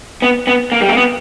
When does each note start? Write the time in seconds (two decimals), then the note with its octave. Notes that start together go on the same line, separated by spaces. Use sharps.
0.22 B3
0.47 B3
0.72 A#3
0.81 G3
0.89 A#3
0.97 B3